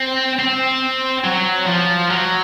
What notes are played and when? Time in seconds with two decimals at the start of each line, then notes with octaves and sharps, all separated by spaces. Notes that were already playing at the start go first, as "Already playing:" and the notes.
Already playing: C4
0.40 C4
1.25 F#3
1.67 F3
2.10 F#3